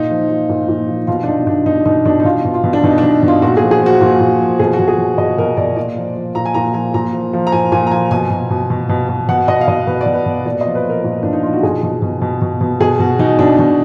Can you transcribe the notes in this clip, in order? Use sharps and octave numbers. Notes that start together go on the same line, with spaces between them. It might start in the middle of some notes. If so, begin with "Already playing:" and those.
Already playing: A#2 D#4
F3
F3
A#2
A#2
F3
B2 F4
D4
B2 D#4
B2 D4
B2 D#4
B2 D#4
B2 D4
D#4
B2 F4
B2
F4
B2
D4
B2 D#4
D4
B2
B2 F4
A#2 F#4
F3 G#4
G#4
F3 F#4
A#2
A#2
F3
B2 G#4
F#4
B2
G#4
B2
B2 D#5
B2 A#4
B2 D5
A#2 D5
F3
F3
A#2 A#5
G#5
A#2 A#5
F3 G#5
A#2 A#5
F3
F3
A#5
A#2 G#5
A#2 G#5
A#5
F3 G#5
B2 G#5
B2
B2
B2
B2
B2
B2 F#5
B2 D#5
F5
B2 D#5
B2 B4
D5
B2
B4
B2
A#2 D5
F3 D#5
B4
F3 A#4
A#2
A#2 D4
D#4
F3 F4
F#4
B2 G#4
B2
B2
B2
B2
B2
B2 G#4
B2 F#4
B2 D#4
B2 D4
B2 D#4